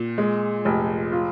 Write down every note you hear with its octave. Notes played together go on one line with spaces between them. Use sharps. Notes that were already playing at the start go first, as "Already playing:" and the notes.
Already playing: A#2
G#3
F1
F4